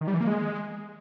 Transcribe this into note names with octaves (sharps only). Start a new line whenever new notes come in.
D#3
G3
E3
A#3
G#3